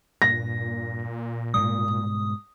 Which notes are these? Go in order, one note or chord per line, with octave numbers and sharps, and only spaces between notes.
G2 A#2 A#6
G#2 B2 G3 D#6